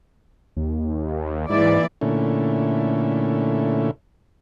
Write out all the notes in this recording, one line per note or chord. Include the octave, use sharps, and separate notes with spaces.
D#2
G#2 E3 A#3 E4 D5
A#2 D3 A3 C#4 E4